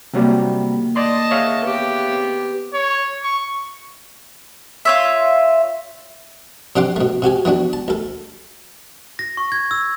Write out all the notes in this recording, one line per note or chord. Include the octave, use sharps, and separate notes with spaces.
D#2 A2 C3 F#3 G3 A#3
D5 D#5 A5 C6
G#4 A#4 B4 C#5 E5 F5
B3 G4
C4
C#5
C#6
F4 C#5 E5
C3 D4 G4 F#5 C6 D6
B2 A3
C3 F#4 G4 G#5
E3 B3 D4 F#4
A5
D2 A4
A#6
C#6
G#6
E6